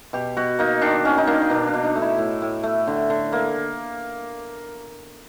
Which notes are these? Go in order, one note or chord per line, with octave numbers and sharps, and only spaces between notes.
B2 G4
B2 F#4
A#3 D#4
D#3 D4
D#3 C#4
D#4
A#3 D4
D#4
B2 D4
D4
B2
D#4
A3
E4
A2
A2
A3
D3
D3
A#3